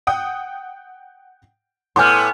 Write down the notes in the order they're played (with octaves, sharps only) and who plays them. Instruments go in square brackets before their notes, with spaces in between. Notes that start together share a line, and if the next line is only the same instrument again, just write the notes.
[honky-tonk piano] F#5 G5 D#6
[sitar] A2 B3 [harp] F#5 G#5 F6 [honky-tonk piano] C6 D6 G6